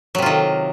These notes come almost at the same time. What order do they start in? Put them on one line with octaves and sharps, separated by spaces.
F#3 C3 F4 D#3